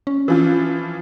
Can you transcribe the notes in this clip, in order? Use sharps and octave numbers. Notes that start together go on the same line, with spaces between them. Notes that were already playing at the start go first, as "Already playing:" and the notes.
C#4
E3 F3 F4